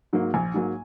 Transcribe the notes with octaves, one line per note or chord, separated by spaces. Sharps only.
G#2 F#3 A#3
A#1 G#5
G#2 F#3 A#3